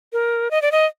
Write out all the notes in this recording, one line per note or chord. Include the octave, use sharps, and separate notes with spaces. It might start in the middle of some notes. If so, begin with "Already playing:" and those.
A#4
D#5
D5
D#5